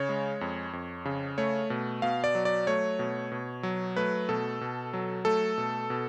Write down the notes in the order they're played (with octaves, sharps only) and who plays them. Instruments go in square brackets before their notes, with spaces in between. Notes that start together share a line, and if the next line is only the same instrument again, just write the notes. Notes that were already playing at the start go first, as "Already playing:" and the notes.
Already playing: [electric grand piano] C#3 C#5
G#3
F2
F2
C#3
A3 C#5
B2
B2 F5
D5
F#3
D5
A3 C#5
B2
B2
F#3
A3 B4
B2 A4
B2
F#3
A3 A4
B2
B2